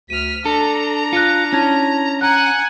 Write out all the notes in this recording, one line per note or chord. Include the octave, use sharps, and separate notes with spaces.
D2 F6 B6 D#7
D4 A4 A#5
F4 F#6 A#6 C#7
C#4 E4 A5 G#6
F#5 G#5 A#5 F#6